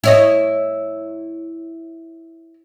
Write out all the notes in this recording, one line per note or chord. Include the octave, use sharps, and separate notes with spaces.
E4 C#5 D#5